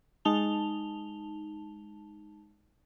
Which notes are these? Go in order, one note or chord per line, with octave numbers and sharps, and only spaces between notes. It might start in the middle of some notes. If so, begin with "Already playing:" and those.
G#3 D#4 A5 F7 G7